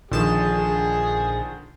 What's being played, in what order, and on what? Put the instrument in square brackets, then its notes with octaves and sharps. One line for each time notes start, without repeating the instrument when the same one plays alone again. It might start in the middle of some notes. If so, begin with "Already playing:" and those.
[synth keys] A#1 A5 E7 [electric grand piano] D3 D#3 F3 [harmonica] G#4